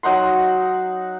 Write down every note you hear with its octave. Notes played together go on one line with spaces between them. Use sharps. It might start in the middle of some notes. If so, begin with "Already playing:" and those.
F#3 D#4 F#5 C6